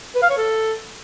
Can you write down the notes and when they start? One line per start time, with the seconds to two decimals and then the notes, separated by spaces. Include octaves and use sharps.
0.15 B4
0.22 F5
0.30 C#5
0.37 A4